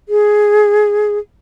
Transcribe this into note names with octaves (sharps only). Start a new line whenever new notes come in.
G#4